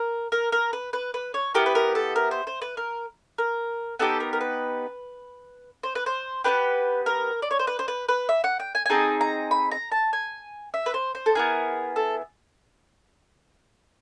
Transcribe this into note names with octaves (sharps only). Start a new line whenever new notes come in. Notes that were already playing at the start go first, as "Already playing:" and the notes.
Already playing: A#4
A#4
A#4
B4
B4
B4
C#5
B3 E4 G4 A#4
B4
A#4
A4
A#4
C5
C5
B4
A#4
A#4
B3 D#4 G4 A4
A#4
A#4
B4
C5
B4
C5
B3 D4 G4 B4
A#4
D5
C#5
C5
B4
C5
B4
B4
E5
F#5
G5
G#5
G#5
C4 D#4 G#4 A5
A#5
B5
A#5
A5
G#5
E5
B4
C5
C5
A4
B3 E4 G#4 A#4
A4